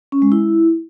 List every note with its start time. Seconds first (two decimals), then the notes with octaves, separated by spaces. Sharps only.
0.12 C#4
0.22 G#3
0.32 E4